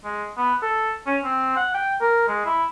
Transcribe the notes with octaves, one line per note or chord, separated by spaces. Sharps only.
G#3
B3
A4
C#4
C4
F#5
G5
A#4
G#3
E4